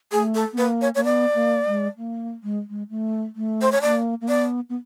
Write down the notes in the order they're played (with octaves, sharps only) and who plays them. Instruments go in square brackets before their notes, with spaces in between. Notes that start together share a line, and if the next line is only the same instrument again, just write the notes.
[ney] A3 [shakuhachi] G#4
[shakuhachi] A4
[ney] B3
[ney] A#3 [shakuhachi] B4
[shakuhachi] C#5
[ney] A#3 [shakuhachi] C#5
[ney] B3 [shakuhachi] D5
[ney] A#3
G#3
A#3
G#3
G#3
A3
A3
[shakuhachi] C5
C#5
[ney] A#3 [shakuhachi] D5
[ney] A#3
[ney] B3 [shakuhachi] D5
[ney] B3